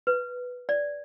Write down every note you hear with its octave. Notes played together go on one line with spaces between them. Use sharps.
B4
D5